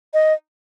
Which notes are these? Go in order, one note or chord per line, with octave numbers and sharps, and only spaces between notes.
D#5